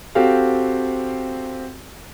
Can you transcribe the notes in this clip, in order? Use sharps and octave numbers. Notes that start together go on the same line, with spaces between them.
C4 F#4 G4 A4 F5